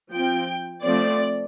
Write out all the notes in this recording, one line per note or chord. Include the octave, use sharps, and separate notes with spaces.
F3 C4 G5
F3 A3 C4 D5